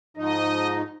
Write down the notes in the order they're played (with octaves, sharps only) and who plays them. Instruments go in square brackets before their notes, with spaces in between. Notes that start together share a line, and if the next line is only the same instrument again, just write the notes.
[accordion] G#2 F3 D#4 [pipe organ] D#5